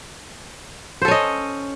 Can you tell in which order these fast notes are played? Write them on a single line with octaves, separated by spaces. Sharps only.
C5 A4 C#4 D#5